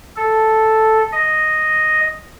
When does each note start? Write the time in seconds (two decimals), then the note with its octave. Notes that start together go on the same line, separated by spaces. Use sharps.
0.17 A4
1.12 D#5